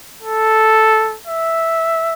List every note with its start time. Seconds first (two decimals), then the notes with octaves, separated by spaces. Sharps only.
0.22 A4
1.27 E5